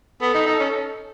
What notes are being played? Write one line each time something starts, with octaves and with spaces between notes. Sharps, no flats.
B3 A4
D#4
D#4
C#4